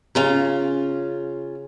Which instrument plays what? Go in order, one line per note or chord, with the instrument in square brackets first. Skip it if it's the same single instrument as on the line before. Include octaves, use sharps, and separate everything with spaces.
[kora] C#3 [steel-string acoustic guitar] C#4 F4 A#5